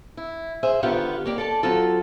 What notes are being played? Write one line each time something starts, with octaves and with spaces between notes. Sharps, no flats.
E4
G#4 C5 E5
D3 D#3 B3 F4 G4 F#5
A#3 G4 D5
A4 D5 A5
F#3 C4 F4 A4